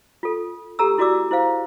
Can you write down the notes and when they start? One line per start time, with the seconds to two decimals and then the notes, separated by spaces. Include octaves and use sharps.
0.23 F4 A4
0.79 G4 A4 A#5 E6
0.98 E4 F#4 D5 D6 E6
1.31 E4 C5 F5